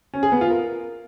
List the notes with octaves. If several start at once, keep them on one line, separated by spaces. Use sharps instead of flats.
C#4
G#4
B3
F4
A#4